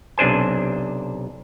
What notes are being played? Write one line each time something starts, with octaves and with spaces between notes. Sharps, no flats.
B1 C3 D4 C5 G#5